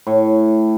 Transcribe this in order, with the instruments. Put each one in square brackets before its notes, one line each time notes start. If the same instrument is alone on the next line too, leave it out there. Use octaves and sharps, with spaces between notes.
[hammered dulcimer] A2